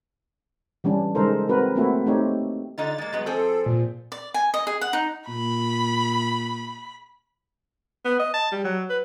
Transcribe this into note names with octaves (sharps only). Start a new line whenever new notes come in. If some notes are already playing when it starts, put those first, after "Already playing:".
E3 G3 C#4 D4
C#3 G#3 D#4 A4 A#4 C5
C4 F#4 A#4 B4
A3 A#3 C4 E4 F#4 A4
A3 C4 D#4 G4 C#5
D3 D#4 F4 A6
G#3 A#3
F#3 G#3 B3
F3 C4 G#4 A4
A#2
D5
G#5
D#5
G#4
F#5
D#4
A#2 B5
B3
D#5
A5
G3
F#3
B4